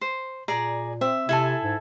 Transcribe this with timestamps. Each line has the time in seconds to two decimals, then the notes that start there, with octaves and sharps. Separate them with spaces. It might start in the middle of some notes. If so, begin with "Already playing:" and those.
0.01 C5
0.48 A#2 G#4 D5 A#5
1.01 C4 E5
1.29 C3 E4 A4 G#5 A5 G#6
1.64 G#2